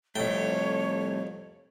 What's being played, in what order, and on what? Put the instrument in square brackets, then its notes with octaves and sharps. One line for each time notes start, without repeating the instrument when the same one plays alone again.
[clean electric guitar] C2 A3 [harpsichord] F2 G5 [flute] C#5